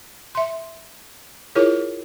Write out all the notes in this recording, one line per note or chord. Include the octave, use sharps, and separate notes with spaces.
E5 C6
E4 F4 G#4 A#4 C#5